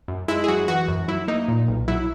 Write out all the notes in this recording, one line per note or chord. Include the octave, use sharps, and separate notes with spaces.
F#2
G#3 E4
G#4
F#2 F#4
E3 F#4
F#2
F#3 E4
A#3 D#4
A#2
B1
F#3 E4